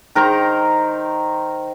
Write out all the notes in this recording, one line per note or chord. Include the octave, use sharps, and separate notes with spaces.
D#3 A#4 C5 A#5